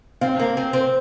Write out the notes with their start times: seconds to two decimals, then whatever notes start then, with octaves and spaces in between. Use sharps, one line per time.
0.21 C4 F5
0.40 A#3
0.57 C4
0.73 C4